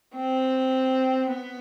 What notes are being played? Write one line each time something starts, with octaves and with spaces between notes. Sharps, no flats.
C4
B3